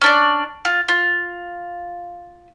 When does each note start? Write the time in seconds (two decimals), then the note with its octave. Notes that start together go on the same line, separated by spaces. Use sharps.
0.01 C#4 D4 D5
0.65 F4
0.88 F4